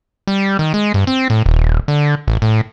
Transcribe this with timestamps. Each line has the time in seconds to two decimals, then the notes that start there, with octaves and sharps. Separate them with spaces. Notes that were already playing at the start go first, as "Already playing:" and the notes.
0.27 G3
0.59 D#3
0.74 G#3
0.94 G2
1.07 C4
1.30 A2
1.46 D#1
1.88 D3
2.28 A1
2.42 A2